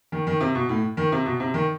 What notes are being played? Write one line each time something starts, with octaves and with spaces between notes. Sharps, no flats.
D#3
D#3
C3
B2
A2
D#3
C3
B2
C3
D#3